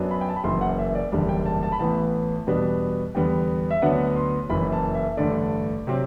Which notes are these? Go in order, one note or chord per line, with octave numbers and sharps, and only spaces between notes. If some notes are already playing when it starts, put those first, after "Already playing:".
Already playing: F#2 F#3 B3 D4
B5
G5
A5
B5
F#1 F#2 E3 C6
F#5
E5
D5
F#1 E2 D3 G3 D4
G5
A5
A5
B5
A1 A2 E3 B3 A5
E2 B2 G3 B3 D4
E2 D3 G3 B3 G5
E5
D2 D3 F#3 B3 D4 F#5
C6
F#1 F#2 E3 B5
A5
E5
A1 G2 D3 A3 D5
C3 F#3 C4